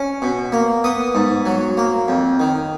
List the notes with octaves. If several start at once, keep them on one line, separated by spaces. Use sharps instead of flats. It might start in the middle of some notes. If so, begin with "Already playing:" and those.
Already playing: C#4
B2
A#3
B3 D#6
G#2
F#3
A#3
F2
D#3